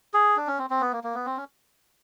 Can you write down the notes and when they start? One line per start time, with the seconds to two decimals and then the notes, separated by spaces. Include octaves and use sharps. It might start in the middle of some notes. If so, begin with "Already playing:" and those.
0.14 G#4
0.36 D4
0.47 C#4
0.59 C4
0.70 C4
0.81 B3
0.93 A#3
1.04 A#3
1.15 B3
1.26 C4
1.37 C#4